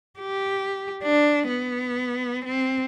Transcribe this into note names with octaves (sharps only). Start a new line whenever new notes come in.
G4
D4
B3
C4